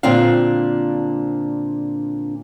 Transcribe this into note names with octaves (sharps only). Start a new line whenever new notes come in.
A#2 D3 C4 D4 F5